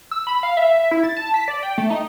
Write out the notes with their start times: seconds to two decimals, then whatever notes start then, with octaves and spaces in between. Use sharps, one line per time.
0.11 E6
0.27 B5
0.43 F5
0.57 E5
0.91 E4
1.04 A6
1.17 A5
1.34 B6
1.48 D5
1.63 G5
1.78 A3
1.90 D#4